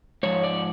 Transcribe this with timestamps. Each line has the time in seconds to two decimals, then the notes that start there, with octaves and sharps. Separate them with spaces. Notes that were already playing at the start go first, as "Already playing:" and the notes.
0.23 G#2 F3 C#5
0.44 D5